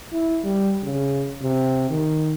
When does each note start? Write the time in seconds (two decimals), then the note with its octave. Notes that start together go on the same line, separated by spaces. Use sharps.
0.12 E4
0.44 G3
0.83 C#3
1.42 C3
1.89 D#3